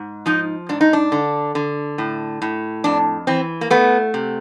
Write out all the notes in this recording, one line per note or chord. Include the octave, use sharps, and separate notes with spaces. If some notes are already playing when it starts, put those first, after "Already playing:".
Already playing: G#2
F3 D#4
G#2 D4
D#4
D4
D3
D3
A2
A2
F2 D4
E3 C4
A#3
A3 B3
C3